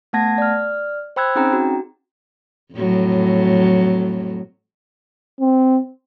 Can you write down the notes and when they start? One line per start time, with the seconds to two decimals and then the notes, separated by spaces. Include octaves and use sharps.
0.13 A3 B3 F#5 A5 G#6 A#6
0.38 D5 F6
1.16 C5 G5 B5 E6 F#6 G#6
1.36 C4 C#4 D#4 G#4 G5 A#5
1.53 F#4
2.74 F2 A2 F#3
5.40 C4